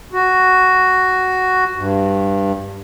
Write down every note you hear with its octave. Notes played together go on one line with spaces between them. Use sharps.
F#4
G2